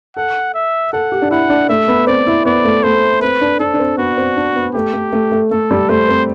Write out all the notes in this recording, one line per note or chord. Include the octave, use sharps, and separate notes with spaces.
A4 F#5
E5
A4 F#5
G4
D4
E4 F#5
D4
A3 E5
B3
C4 D5
E4
B3 D5
A3
A3 C5
C4 B4
D4
D4 A4
D4
C4
B3 F#4
C4
D4
B3
A3 G4
A3
A3
A3
A3 A4
G3
A3 C5
C4